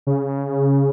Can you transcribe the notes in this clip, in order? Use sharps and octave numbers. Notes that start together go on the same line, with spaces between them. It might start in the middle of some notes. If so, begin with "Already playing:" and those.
C#3